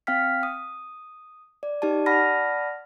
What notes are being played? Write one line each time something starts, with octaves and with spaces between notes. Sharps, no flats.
C4 F5 G5 F6 B6
D#6
D5
D#4 G4 D5 A5
D5 F#5 A5 B5 F6 A#6